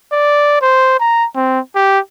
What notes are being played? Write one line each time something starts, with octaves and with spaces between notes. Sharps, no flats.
D5
C5
A#5
C4
G4